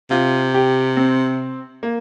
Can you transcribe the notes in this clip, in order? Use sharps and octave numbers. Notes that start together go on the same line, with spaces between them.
C3 F4
G4
C4
A#3